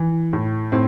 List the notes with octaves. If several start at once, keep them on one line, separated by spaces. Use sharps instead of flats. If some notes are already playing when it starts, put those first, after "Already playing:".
Already playing: E3
A2
A2 C4